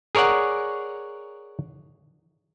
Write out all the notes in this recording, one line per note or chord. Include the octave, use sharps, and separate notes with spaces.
G#4 A#4 C#5 D5 F#5